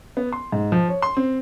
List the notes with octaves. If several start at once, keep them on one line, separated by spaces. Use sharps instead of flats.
B3
C6
G#2
F3
C#5
C6
C4